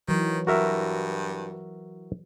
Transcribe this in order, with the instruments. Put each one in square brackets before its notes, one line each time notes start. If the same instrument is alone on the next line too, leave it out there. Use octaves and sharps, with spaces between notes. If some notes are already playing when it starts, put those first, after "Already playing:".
[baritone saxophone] D#3 [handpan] E3 F#3
[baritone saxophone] G2 [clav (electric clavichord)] F#4 A#4 E5